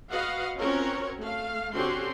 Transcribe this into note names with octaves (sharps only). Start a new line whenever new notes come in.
F#4 B4 D#5 F5 F#5
C4 C#4 F4 F#4 A#4 C#5
A3 F5
D3 C4 C#4 F#4 G4 C6